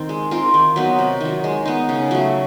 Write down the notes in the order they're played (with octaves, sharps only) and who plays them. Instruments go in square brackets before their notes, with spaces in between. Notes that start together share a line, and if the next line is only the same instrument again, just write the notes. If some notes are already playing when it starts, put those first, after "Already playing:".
Already playing: [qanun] D#3 C4
G#3
C4 F4 A#4
D#3
F#3 B3 D#4
C3
D#3 F#3
G#3
B3 D#4
C#3
F#3 A3